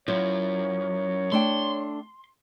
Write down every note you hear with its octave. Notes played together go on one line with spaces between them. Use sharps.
F#2 E4 F4 C5 C#5
A3 D4 G5 C6